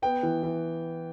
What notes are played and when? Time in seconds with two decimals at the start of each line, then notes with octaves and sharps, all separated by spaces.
0.02 B3 G5
0.23 E3
0.43 E3